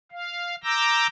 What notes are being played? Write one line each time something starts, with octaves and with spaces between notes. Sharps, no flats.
F5
A#5 D6 E6 G6 A#6